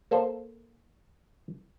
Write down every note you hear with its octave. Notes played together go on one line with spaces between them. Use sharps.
A#3 A4 C5